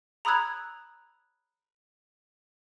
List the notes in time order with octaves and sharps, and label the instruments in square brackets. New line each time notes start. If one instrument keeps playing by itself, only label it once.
[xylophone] A#5 B5 D#6 E6 F#6 G#6